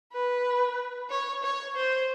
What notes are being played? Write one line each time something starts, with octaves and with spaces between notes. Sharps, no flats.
B4
C#5
C#5
C5